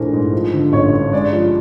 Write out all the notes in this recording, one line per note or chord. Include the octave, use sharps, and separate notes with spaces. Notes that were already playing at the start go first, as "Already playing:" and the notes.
Already playing: A#1 E3 A3 A#4 C5
G#2
F3
D3
A1 C#5
G2
G#3 D5
F3